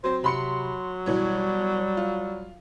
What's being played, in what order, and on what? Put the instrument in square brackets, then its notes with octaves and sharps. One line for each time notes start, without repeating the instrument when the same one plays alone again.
[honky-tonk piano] F#3 C4 [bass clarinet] C5
[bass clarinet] C3 [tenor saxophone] F#3 [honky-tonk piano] B5 C6 C#7
[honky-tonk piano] B2 E3 C#5 [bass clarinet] G3
[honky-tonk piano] F4